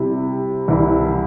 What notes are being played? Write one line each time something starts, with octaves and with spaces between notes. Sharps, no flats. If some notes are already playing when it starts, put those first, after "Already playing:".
Already playing: C3 G3 E4
C2 C3 E3 G3 E4